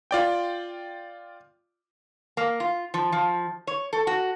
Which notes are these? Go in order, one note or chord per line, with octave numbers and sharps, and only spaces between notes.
F4 D5 G5
A#3
F4
F3
F3
C#5
A4
F#4